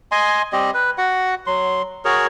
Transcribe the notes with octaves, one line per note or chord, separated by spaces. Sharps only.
D#5 G#5 C6
G3 C4 G4 D#5
B4
F#4 F#5
F#3 C6
F#4 G#4 A#4 C#5